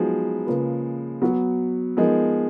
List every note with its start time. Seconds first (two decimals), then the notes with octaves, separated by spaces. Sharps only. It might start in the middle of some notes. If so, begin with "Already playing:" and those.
Already playing: F3 F#3 G#3 B3 D#4 F#4 B4
0.46 C#3 F3 A#3 F4 B4
1.21 F#3 B3 F#4
1.97 F3 G#3 B3 D#4 A#4 D#5